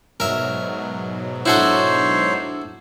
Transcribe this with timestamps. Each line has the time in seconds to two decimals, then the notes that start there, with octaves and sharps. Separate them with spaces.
0.20 G#2 B2 F#3 A#4 E5
1.46 D4 E4 F#4 A4 C5 C#5 E6